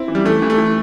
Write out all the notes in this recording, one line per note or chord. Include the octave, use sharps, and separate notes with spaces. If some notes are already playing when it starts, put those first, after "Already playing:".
Already playing: C4 E4
E3
G3
E3 A3
E3
A3
E3